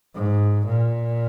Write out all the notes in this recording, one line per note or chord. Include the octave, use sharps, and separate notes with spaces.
G#2
A#2